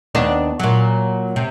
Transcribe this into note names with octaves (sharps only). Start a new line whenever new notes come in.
D#2 B3 D4
A#2 F#3
C3